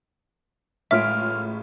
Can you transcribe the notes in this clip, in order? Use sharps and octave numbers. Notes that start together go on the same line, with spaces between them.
A1 A2 G#3 F4 C#5 E5 F6 D7